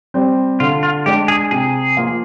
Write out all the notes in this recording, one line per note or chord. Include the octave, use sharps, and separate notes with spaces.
G3 C4
D3 F4
F4
G#3 D4 G4
G#4
C3 G#4
F3 A#3 F4